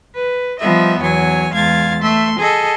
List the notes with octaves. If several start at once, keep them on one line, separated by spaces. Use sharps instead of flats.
B4
F3 G3 B3 D#5 E5
E2 F#3 C#5 G#5
E2 G#3 F5 G#6 A6
A3 E5 C6
G#4 A4 D#5